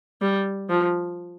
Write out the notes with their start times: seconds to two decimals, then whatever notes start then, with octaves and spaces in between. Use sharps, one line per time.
0.22 G3
0.69 F3